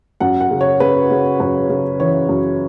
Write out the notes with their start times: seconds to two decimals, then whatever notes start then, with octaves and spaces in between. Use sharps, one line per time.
0.20 F#2 F#5
0.41 F#5
0.51 C#3
0.61 C#5
0.80 C#3 B4
1.11 C#3
1.40 F#2 B4
1.69 C#3
1.99 E3 C#5
2.29 F#2